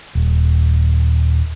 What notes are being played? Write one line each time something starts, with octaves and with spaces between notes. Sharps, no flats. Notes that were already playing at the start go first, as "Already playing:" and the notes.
D#1